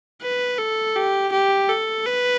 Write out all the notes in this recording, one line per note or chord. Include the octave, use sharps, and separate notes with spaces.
B4
A4
G4
G4
A4
B4